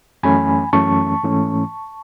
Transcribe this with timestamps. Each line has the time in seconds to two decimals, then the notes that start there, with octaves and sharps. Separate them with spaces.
0.23 F#2 E3 A3 C#4 G#5 B5
0.73 F#2 E3 A3 C#4 A5 C#6
1.23 G#2 E3 A3 C#4